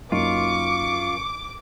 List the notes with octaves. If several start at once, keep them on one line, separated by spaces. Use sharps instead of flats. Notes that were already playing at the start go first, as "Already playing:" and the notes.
F#2 A#3 D#4 F4 C#6 D6